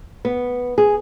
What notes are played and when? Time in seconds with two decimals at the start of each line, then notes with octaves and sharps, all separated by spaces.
0.25 B3
0.78 G#4